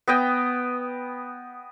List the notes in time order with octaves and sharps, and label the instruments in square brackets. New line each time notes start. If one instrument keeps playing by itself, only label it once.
[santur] B3 D#5 G5